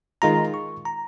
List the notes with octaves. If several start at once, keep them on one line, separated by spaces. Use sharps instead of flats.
D#3 G#3 F4 A#5
C#6
A#5